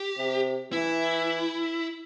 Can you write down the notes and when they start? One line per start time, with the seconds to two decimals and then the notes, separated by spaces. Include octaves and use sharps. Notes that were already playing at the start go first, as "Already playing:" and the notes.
Already playing: G4
0.18 C3
0.72 E3 E4